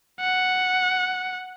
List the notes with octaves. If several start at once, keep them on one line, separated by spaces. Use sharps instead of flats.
F#5